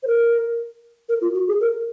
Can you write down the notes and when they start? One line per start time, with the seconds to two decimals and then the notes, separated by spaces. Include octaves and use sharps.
0.03 C5
0.07 A#4
1.09 A#4
1.21 F4
1.34 F#4
1.48 G#4
1.61 A#4